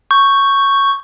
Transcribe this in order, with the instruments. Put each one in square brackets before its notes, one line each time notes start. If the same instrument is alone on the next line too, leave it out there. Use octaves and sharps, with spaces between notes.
[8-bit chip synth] C#6 G6